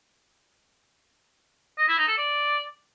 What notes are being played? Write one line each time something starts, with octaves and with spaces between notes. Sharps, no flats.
D#5
E4
D#4
A4
D5